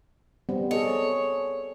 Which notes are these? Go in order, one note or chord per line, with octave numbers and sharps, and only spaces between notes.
G3 B3 C4
G#4 A4 C#5 D#5